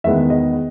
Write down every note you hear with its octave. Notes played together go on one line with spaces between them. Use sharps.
E2 D#3 G#3 B3 E5
D#5